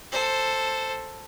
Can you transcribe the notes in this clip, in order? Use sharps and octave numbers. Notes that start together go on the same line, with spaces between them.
A4 C5